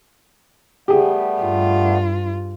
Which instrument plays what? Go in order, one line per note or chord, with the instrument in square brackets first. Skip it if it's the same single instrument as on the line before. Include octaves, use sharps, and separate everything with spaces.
[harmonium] G3 A3 B3 [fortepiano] G4 G#4
[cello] G2 F4